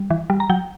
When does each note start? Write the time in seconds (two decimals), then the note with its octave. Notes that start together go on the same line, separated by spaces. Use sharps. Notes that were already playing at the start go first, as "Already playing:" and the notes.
Already playing: G3
0.10 E3
0.30 G3
0.40 A#5
0.50 F#3 G5